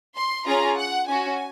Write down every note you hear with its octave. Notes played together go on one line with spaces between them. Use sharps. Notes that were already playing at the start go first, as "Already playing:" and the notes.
C6
C#4 F4 G#4 A#5
F#5
C#4 F#4 G#5